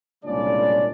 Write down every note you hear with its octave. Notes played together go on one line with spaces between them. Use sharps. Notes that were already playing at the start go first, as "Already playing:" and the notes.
C2 A#2 C#3 G#3 D4 D5